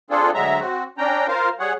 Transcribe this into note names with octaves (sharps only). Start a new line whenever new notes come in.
C4 D4 F4 G#4 A4
D2 F#3 G#3 E5 A#5
C4 F#4
C#4 D4 G5 A#5
F4 A#4 C5 F5
G3 G#4 C#5 F#5